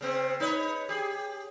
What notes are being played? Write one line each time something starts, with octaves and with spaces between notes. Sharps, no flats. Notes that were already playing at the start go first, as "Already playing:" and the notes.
C#3 B3 C4
D#4 B4 C#5
G4 G#4